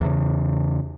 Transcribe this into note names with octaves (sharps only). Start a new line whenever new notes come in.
E2 C#3